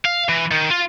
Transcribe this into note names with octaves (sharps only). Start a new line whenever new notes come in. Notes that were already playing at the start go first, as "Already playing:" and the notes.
F5
E3
D#3
F4